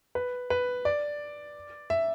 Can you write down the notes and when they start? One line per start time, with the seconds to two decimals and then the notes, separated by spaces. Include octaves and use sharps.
0.15 B4
0.50 B4
0.85 D5
1.90 E5